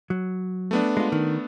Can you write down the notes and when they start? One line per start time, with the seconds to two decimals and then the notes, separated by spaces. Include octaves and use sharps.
0.10 F#3
0.71 A3 B3 D4
0.97 G#3 F4
1.12 D#3